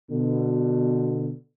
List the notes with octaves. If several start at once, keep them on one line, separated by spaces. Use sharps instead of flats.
B2 D3